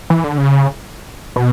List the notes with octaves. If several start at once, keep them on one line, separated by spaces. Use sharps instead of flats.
E3
D3
C#3
B2